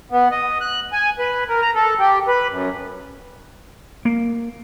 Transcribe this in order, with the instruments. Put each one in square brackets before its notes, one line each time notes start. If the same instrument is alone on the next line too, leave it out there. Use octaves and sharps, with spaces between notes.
[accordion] B3
D#5
F#6
G#5
B4
A#4
A#5
A4
G4
B4
F#2
[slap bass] A#3